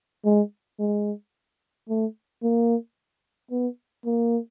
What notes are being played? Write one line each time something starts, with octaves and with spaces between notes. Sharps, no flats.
G#3
G#3
A3
A#3
B3
A#3